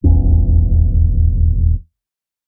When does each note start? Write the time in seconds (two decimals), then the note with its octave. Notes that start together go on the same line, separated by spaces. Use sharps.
0.04 D#1 G#1 E2 C#4